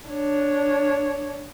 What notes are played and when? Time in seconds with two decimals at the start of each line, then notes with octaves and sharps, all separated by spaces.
0.10 D4 C#5